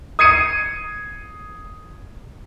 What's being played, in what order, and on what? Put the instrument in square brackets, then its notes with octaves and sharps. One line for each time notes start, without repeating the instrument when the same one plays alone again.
[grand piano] D#6 G#6 C7 C#7 D#7